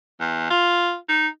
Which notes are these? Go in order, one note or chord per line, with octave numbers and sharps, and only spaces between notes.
E2
F4
D#4